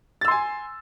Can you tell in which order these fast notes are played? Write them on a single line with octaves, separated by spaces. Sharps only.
A6 E6 C6 G#5